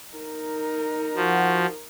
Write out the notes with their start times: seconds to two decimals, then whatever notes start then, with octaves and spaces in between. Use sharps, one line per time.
0.14 D#4 A#4
1.16 F3 F#4